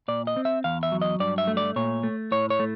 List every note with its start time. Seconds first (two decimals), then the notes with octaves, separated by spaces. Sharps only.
0.08 A#2 D5
0.27 D#5
0.37 C4
0.45 E5
0.64 E2 F5
0.83 E5
0.92 F#3
1.02 D#5
1.20 G2 D5
1.38 E5
1.48 A3
1.57 D5
1.76 A#2 C#5
2.03 A3
2.31 A2 C#5
2.50 C#5
2.60 A3